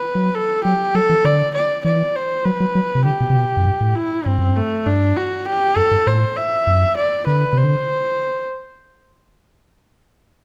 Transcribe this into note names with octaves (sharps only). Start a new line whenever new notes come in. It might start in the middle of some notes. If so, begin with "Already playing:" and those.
Already playing: B4
F#3
A4
F#3 G4
F#3 A4
E3
D3 D5
D5
E3 D5
C5
F#3 B4
F#3
F#3
C3
D3 G4
B2
C3
B2
F#2
G2
A2
E4
G2 C4
F#2
G2
A3
G2 D4
F#4
G4
F#2 A4
G2
A2 C5
E5
F#2
D5
D3 B4
C3 C5
D3